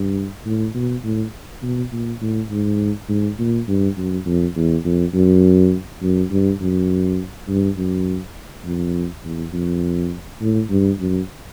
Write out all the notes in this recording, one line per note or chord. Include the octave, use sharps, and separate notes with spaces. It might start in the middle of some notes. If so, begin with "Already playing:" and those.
Already playing: G2
A2
B2
A2
B2
A#2
A2
G#2
G#2
A#2
G2
F#2
F2
E2
F2
F#2
F#2
G2
F#2
G2
F#2
F2
E2
F2
A2
G2
F#2